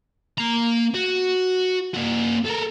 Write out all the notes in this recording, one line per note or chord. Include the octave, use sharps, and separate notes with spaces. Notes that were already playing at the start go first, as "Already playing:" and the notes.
A#3 A#5
F#4
A#3 F#4
A4 A#4